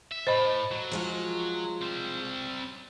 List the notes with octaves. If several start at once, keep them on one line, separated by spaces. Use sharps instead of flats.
E5
A2 C5 D#5 B5
F#3
F3 G#3 F4
G3 C4